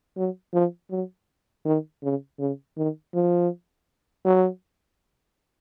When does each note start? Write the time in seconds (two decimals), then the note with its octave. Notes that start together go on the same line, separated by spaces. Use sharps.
0.17 F#3
0.54 F3
0.91 F#3
1.65 D#3
2.03 C#3
2.39 C#3
2.77 D#3
3.15 F3
4.25 F#3